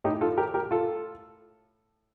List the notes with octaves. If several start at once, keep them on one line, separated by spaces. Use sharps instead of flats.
A2 D#4 G4
F4 A4
G4 A#4
G4 A#4
F4 A4